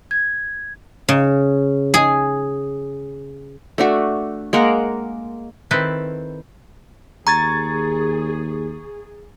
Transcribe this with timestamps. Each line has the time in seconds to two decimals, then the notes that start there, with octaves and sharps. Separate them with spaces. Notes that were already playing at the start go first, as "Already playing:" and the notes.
0.11 G#6
1.09 C#3
1.94 G#4
3.78 A3 D4 F#4
4.53 G#3 A#3 A#4 F#5
5.71 D#3 C4 E4 A4 B4
7.27 D#2 G#4 A#5 C#6 G#6 A6